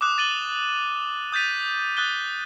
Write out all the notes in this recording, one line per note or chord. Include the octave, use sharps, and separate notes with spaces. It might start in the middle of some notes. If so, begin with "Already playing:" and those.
D6 D#6 F#6 E7
A6 D#7 F#7 G7
D#6 G6 A6 B6 D#7
D#6 F#6 A6 D#7 G7